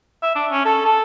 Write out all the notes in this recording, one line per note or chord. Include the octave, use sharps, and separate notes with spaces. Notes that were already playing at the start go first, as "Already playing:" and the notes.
E5
D4
C#4
A4
A4